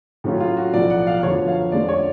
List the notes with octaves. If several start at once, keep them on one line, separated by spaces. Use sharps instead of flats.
A2 F#3 C#4 F4
F4
F#4
B1 A2 F3 D5
F#5
F5
F#2 D3 F3 B3 C#5
F5
F2 D3 G#3 C#4 F4 D5
C#5